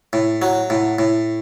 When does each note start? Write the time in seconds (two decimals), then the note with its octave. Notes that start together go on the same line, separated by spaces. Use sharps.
0.13 A2
0.42 F#3
0.70 A2
0.99 A2